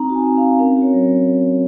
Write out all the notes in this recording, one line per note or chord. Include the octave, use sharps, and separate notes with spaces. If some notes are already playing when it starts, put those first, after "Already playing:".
Already playing: C4 D#4 A#5
F#4
G#5
C4
C4 F5
C#4 A#4
F#4
C#5
F#3